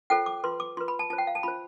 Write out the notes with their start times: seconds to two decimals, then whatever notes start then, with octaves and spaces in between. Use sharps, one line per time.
0.10 F4 A4 C5 G5
0.26 D6
0.44 F4 B4 C6
0.60 D6
0.77 F4 B4 C6
0.88 B5
0.99 A5
1.10 F4 C5 A5
1.18 G5
1.27 F5
1.35 A5
1.43 F4 C5 B5